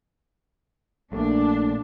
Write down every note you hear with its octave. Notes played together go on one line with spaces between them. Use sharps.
A#1 A3 A#3 D4